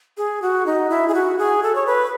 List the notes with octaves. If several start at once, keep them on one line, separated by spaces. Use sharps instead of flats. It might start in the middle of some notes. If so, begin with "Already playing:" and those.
G#4
F#4
D#4
E4
G#4
F#4
G#4
A4
C#5
B4